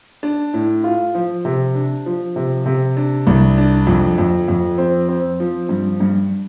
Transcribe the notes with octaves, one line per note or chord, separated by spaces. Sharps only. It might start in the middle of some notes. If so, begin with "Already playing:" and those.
D4
A2
F4
F3
C3
D4
F3
C3
C3
D4
C2
D4
F2
F2
F2
C4
C4
F3
G2
G2